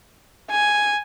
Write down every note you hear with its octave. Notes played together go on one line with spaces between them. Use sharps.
G#5